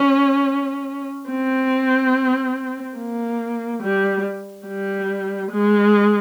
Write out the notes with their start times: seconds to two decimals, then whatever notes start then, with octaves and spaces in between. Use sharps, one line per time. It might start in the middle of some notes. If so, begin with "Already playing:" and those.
Already playing: C#4
1.30 C4
2.98 A#3
3.83 G3
4.67 G3
5.51 G#3